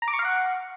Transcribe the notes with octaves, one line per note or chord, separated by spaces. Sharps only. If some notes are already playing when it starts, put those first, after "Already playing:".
A#5
D6
C#6
F5
F#5